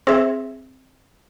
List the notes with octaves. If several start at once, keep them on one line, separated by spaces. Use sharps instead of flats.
C4 G#4 E5